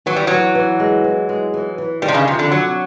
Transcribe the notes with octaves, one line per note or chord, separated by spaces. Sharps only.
E3 F#3
G3
E3 F#3
E3
G#3
E3
G#3
E3
E3
D#3 G3
C3
C#3
F2 C3
D3
C3 F#3